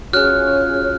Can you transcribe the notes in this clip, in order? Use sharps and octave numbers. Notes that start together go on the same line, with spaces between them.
C#4 F4 F#4 G#4 C#5 F6 F#6